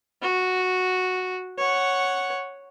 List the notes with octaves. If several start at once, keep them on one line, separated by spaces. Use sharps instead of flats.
F#4
C#5 F#5